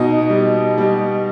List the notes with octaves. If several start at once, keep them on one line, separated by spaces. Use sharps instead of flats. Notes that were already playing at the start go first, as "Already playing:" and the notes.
Already playing: B2 D#4 D#5
G3
G3